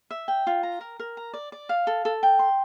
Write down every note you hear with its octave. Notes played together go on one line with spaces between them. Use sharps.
E5
G5
F4
A#5
A#4
A#4
A#5
D5
D5
F5
A4
A4
G5
C6